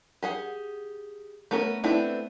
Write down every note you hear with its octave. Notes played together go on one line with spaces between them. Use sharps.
G4 G#4 F#5
A3 B3 C#4 A#4
A3 B3 C4 D4 E4